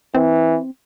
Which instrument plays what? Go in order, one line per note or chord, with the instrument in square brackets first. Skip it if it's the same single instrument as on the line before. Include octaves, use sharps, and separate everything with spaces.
[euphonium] E3 [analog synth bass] C4